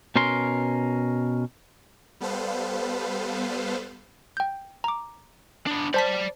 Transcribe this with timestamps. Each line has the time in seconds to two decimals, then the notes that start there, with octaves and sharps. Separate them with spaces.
0.16 B2 C#4 A#4 C6
2.21 G3 B3 A4 B4 C5 F5
4.37 G5 G6
4.84 A#5 D6
5.67 B3 D4
5.94 C5 D5 A5 B5 B6